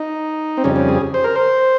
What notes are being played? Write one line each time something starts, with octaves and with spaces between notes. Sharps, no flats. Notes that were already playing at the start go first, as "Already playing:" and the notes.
Already playing: D#4
C4
F2 C#3 G3 C#4
C#4
G#4
C5
A#4
C5